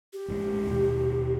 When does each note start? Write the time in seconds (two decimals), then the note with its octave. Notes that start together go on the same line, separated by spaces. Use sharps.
0.13 G4
0.28 A1 A2 G#3
0.67 D#2 B2